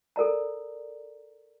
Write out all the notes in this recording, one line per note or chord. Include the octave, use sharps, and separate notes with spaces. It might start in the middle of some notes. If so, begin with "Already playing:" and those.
A4 A#4 D5 A#5